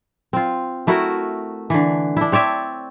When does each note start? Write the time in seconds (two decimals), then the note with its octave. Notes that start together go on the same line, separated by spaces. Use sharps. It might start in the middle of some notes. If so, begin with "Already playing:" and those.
0.33 C4 F4
0.87 A3 E4 F#4 A#4
1.70 D3 E3
2.17 D4 E4
2.32 C4 C#5 D5 E5